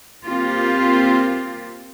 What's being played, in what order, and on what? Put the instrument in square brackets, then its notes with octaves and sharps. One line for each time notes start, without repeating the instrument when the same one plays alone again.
[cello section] A#3 C4 F4 G4